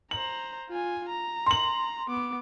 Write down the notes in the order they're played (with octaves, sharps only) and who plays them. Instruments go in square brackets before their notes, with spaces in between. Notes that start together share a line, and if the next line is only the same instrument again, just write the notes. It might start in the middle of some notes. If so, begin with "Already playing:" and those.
[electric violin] C5 A#5 [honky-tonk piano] F#7
[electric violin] F4 G#5
A#5
[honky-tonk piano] C6 F#7
[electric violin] B3 D6